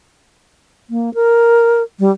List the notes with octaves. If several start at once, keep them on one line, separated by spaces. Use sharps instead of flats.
A#3
A#4
G3